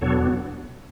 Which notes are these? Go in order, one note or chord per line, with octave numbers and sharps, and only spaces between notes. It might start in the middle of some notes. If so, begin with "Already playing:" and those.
E2 B2 F#3 B3 D4 A4 C#5